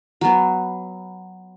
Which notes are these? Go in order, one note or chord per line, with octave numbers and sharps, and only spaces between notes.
F#3 B3